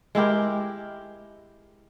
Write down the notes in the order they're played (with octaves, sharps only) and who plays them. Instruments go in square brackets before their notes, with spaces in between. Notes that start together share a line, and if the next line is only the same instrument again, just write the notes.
[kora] G#3 E4 G4 A#4